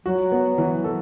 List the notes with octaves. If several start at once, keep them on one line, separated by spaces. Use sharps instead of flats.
F#3 F#4
B3
E3
A4